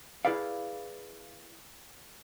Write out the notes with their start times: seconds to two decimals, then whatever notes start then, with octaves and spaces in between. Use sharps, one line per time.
0.25 E4 G#4 B4 D5 F5